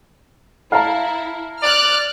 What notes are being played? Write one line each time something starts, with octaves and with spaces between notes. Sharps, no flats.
E4 F5 A5 A#5
D5 F6 F#6